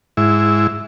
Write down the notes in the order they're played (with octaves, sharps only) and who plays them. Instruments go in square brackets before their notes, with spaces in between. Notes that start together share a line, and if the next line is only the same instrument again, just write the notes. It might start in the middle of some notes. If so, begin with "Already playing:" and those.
[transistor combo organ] G#2 E4